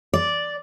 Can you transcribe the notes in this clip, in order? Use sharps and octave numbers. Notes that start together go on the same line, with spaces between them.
D5